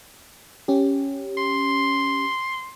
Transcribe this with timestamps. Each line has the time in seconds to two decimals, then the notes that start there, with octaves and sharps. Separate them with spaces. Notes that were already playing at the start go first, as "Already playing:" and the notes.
0.68 C#4 G4
1.38 C6